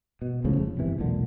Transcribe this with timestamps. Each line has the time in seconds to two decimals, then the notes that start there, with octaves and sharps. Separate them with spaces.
0.22 B2
0.44 C#2 A2 C#3 F3
0.57 F1
0.78 G1 C3 E3
0.99 E1 B1 A#2 D3